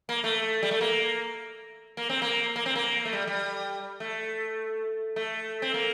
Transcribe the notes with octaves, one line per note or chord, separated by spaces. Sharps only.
A#3
A3
G3
A3
A#3
A#3
C4
A#3
A#3
C4
A#3
A3
G3
G3
A3
A3
C4
A#3